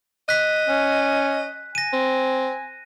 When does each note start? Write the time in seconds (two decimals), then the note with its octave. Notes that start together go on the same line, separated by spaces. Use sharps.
0.29 D#5 F#6 B6
0.69 C#4
1.75 G#5 A#6 D#7
1.93 C4